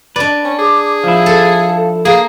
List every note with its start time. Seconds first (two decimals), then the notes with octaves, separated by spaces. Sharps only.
0.16 D4 B4 D5
0.45 C#4
0.59 G#4 D6
1.04 F3 E4 F5
1.26 A4
2.05 A#3 G#4 F5